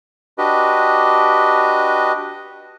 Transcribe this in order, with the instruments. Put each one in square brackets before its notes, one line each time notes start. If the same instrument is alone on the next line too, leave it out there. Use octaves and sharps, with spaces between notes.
[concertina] D4 F#4 G4 B4 D#5